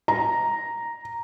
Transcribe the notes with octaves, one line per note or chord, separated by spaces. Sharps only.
A#5